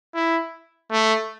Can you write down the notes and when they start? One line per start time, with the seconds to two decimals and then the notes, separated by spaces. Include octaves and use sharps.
0.15 E4
0.92 A3